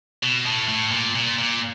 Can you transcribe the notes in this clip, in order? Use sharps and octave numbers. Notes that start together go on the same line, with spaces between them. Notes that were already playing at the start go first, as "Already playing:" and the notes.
B2
A2
A2
A#2
A#2
A#2